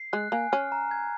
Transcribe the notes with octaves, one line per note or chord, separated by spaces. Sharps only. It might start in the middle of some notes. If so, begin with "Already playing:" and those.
Already playing: C7
G#3 F#6
A#3 G#5
C#4 F6
A#5
G#6